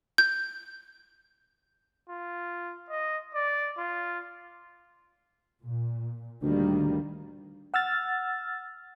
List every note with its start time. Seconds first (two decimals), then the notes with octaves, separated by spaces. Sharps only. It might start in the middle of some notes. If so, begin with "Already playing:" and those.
0.18 G6
2.10 F4
2.90 D#5
3.35 D5
3.78 F4
5.64 A#2
6.42 D2 D#3 G3 A#3
7.74 F#5 E6 F6 A6